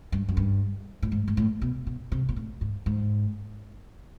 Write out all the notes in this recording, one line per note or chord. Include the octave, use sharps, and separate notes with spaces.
G2
F#2
G2
A2
G#2
G#2
A2
B2
B2
C3
A#2
A2
G#2
G#2